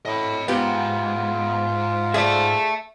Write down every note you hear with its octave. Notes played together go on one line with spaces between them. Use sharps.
A2 D#5 B5
G#2 B3 F4 G4
G#4 D5 E5 A5